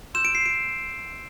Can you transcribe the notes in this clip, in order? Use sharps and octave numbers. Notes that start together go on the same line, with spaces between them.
C6 E6 G6 E7
D7
C7
D7